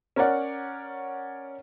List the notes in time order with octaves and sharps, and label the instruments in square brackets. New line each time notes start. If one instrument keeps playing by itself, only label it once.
[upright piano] C#4 A#4 C#5 D5 F#5